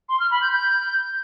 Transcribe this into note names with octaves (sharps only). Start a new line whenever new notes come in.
C6
F6
B5
G6
G6